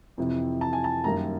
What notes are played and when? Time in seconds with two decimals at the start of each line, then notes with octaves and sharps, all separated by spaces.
0.18 F2 C3 E3
0.61 A5
0.73 G#5
0.84 A5
1.04 F#2 D#3 G3 A#3 A#5